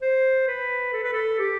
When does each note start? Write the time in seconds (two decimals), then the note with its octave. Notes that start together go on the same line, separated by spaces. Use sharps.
0.02 C5
0.47 B4
0.93 A4
1.03 B4
1.13 A4
1.39 G4